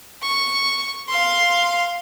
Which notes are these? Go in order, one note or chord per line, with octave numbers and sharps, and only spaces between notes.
C#6
F5 C6